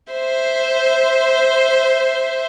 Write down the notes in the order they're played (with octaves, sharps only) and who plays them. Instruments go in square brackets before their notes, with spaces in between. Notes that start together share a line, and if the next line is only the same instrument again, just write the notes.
[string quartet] C5 E5 C6